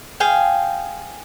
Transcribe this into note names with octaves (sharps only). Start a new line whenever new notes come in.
G#4 F5 G5